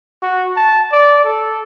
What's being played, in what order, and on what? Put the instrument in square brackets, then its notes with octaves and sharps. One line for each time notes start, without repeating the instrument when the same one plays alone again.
[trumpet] F#4
A5
D5
A4